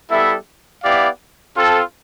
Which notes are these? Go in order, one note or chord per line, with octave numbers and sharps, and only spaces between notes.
G3 B3 E4 A4 E5
B3 E4 G4 D5 F5
C4 F4 A4